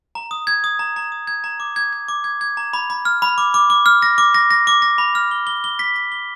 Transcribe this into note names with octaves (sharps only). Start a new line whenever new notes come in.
A#5
D#6
G#6
D#6
A#5
A#5
D#6
G#6
A#5
D6
G#6
G#6
D6
G#6
G#6
A#5
B5
B5
F6
B5
D6
D6
D6
F6
A#6
D6
A#6
A#6
D6
A#6
B5
F6
G7
G7
G7
B6
B6
G7